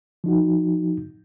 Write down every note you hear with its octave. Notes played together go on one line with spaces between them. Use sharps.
F3 D#4 F#4